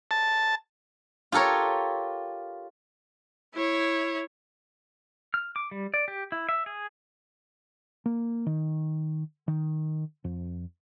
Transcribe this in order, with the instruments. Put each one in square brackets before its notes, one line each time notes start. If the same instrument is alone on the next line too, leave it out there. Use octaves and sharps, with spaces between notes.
[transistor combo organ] A5
[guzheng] F4 G4 A4 A#4 C#5
[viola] E4 C#5
[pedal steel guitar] F6
D6
G3
D5
G4
E4
E5
G#4
[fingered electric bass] A#3
D#3
D#3
F2